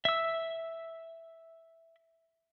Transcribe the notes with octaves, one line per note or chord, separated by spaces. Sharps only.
E5 E6